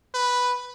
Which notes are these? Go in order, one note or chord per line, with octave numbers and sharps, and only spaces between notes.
B4